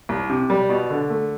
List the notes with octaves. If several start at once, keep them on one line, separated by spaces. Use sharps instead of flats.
C2
C3
G3
B2
D3
A3